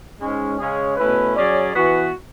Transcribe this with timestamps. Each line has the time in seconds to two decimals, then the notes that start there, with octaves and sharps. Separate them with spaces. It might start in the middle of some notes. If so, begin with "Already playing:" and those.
0.21 G#2 G#3 C#4
0.59 C#3 G#3 C#4 G#4 C#5
0.97 B2 A3 C#4 E4 B4
1.35 F#3 C#4 G#4 D5
1.73 E3 B3 F#4